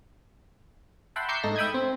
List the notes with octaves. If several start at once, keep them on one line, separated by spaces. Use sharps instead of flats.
E5 F#5 G5 A5 B5 C6
A#5 C#6 D6 E6 G6 C7
G#2 A3 D#4 A5 A#6
E5 G5 B5 D#6 G6 G#6
C4